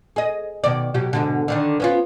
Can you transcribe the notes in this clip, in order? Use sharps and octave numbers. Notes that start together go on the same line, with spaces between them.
G#4 D#5
B2 D#3 D5
B2 F#3 G4
G#2 B2 D3
D3 D#3 D4
B3 C#4 F4